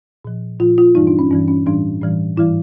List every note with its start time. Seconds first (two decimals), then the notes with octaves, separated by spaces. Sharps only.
0.25 A#2 F3
0.60 A#2 F3 F4
0.78 F4
0.95 G2 E3 G3 D#4
1.07 D4
1.19 C#4
1.30 G2 E3 G3 C#4
1.48 C#4
1.66 A2 E3 G3 D4
2.01 A2 E3 G3
2.37 G#2 E3 G3 E4